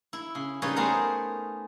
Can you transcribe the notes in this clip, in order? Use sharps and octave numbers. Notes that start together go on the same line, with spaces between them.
E4
C#3
C#3 G3 D#4 B4 C#5
A3 B3 G#4 A#4 C5 C#5